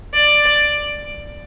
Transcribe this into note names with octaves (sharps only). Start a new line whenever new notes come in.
D5